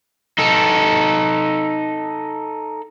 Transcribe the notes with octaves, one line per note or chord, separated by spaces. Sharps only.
D#4 A4